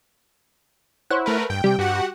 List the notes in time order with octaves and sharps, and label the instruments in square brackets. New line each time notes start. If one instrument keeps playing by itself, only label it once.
[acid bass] E4 [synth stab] C5 C#5 F#5
[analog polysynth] A3 A#4 B4
[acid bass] G2 [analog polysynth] G5
[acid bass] C3 [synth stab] G3 D7
[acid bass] G2 [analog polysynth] F#4 G4 F#5